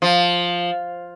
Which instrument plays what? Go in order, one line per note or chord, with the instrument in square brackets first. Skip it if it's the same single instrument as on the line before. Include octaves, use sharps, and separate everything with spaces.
[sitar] F3